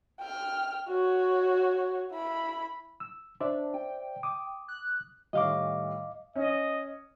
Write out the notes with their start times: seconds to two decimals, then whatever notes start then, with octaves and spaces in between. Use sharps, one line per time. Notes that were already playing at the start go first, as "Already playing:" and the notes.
0.20 G5 F6
0.88 F#4 C#5
2.12 E4 B5
3.00 E6
3.40 D4 C5 D5 E5
3.74 G5
4.23 D6 D#6
4.68 F#6
5.33 A2 D#3 G3 D#5 F5 D6
6.36 C#4 D#5